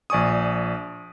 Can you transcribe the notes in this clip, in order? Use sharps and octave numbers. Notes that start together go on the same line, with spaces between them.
A#1 D5 G#5 C#6 D#6